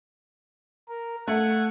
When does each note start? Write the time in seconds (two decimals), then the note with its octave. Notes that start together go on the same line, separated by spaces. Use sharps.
0.88 A#4
1.28 A3 F#5 G#6